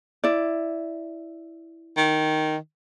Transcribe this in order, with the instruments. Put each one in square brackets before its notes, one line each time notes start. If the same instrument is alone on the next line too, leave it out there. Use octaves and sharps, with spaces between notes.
[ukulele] E4 D5
[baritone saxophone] D#3